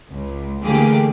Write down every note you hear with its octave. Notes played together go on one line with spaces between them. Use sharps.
C#2
D3 E3 A3 A#3 G4 G#4